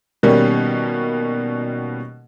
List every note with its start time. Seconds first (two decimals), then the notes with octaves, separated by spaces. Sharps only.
0.23 B2 D#3 G3 A#3 C#4